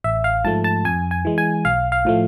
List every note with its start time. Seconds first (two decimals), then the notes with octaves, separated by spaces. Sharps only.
0.04 A1 E5
0.24 F5
0.45 G#2 F3 A3 A5
0.64 A5
0.84 F2 G#5
1.11 G#5
1.25 E3 G#3
1.38 G#5
1.65 B1 F5
1.92 F5
2.05 A2 F3 A3